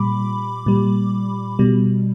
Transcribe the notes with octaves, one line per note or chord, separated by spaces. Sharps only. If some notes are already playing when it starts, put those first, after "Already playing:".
Already playing: A#2 G3 B5 D6
A#2 G3
B2 G3